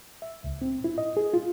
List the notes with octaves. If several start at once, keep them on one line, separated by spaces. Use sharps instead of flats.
E5
C#2
C4
E4
D#5
G#4
F4